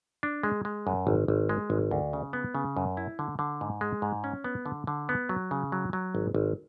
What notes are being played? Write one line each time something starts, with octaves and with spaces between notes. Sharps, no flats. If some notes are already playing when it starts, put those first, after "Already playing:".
D4
G#3
G#3
F#2
G#1
G#1
G#3
G#1
D2
C#3
B3
C#3
F#2
E4
D3
D3
G#2
G#3
G#2
C#4
B3
D3
D3
B3
F#3
C#3
F#3
F#3
G#1
G#1